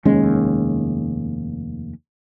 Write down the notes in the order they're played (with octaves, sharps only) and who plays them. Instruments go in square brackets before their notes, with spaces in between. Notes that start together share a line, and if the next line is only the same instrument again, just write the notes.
[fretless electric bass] F1 D#2 G#3 C#4